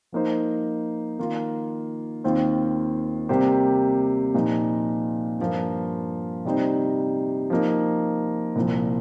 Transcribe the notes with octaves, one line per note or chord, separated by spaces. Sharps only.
F3 A#3 D#4 C5
D#3 A#3 F4
D#2 D#3 C4 F4 C5
C3 G3 A#3 G4 C5
A#2 F3 D#4
G2 F3 A#3 F4
C3 G3 D#4 C5
F3 A#3 D#4
C2 A#2 F3